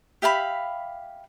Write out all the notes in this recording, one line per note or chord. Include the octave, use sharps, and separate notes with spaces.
G4 E5 F5 B5